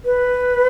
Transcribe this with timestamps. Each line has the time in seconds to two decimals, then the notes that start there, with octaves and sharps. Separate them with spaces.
0.05 B4